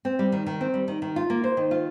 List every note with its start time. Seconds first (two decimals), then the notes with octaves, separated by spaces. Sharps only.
0.05 C4
0.19 G3
0.32 D#3
0.46 D#3
0.61 C4
0.74 G3
0.88 D#3
1.02 D#3
1.16 F4
1.30 A#3
1.44 C5
1.57 D#3
1.71 F4